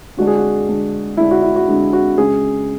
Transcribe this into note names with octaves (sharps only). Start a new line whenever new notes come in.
D3 G#3 D4 F#4
G#4
F#4
D3 G#3 D4
D3 G#3 D4 E4
F#4
E4
F#4
D3 G#3 D4
F#4
C#3 G#3 C#4 G#4